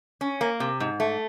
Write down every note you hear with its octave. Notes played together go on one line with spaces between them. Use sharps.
C#4
A#3
C3
G#2
A3